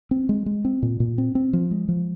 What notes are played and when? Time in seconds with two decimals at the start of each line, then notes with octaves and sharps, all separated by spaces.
0.11 C4
0.29 G#3
0.46 G#3
0.65 C4
0.82 A#2
1.00 A#2
1.18 C4
1.35 C4
1.53 F3
1.71 G#3
1.89 F3